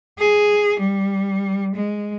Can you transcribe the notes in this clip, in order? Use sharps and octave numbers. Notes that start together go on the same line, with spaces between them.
G#4
G3
G#3